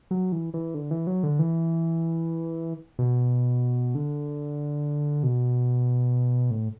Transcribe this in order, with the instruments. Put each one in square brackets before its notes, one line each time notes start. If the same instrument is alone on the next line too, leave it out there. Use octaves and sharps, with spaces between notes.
[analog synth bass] F#3
E3
E3
D3
E3
F#3
D3
E3
B2
D3
B2
A2